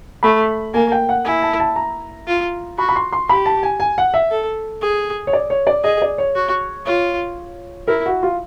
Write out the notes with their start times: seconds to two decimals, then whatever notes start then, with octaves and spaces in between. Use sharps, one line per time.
0.23 A3 B5
0.74 A#3 G#5
0.92 G5
1.09 F#5
1.25 E4 G#5
1.42 A5
1.60 A5
1.76 A#5
2.27 F4
2.78 F#4 B5
2.89 B5
2.96 C6
3.13 C6
3.29 G4 B5
3.46 A5
3.63 G#5
3.80 G#5
3.98 F#5
4.14 E5
4.31 A4
4.82 G#4
5.27 C#5
5.33 D5
5.50 C#5
5.67 D5
5.84 G#4 D#5
6.02 D5
6.18 C#5
6.35 F#4
6.86 F4 C#5
7.88 E4 A#4
8.06 F#4
8.23 F4